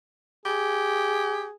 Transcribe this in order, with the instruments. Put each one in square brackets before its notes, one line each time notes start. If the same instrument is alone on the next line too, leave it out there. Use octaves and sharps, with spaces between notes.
[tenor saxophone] G4 [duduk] G#4